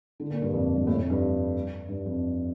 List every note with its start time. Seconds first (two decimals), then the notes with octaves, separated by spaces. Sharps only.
0.20 D3
0.30 A#2
0.42 G2
0.53 F2
0.76 G2
0.87 A2
0.98 F2
1.10 G2
1.89 G2
2.06 F2